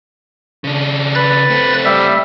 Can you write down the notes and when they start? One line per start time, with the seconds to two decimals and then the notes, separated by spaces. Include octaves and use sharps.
0.64 C#3 D4
1.15 B4 F#6 A6
1.50 A3 C4
1.85 G3 E5